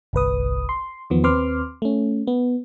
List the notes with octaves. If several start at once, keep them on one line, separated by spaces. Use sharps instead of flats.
G1 C2 B4 D#6
C6
E2 D#3 F3 B3
D#2 C4 B4 C6 D6 F6
A3 C#4
B3